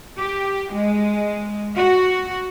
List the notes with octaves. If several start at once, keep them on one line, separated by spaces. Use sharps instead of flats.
G4
G#3
F#4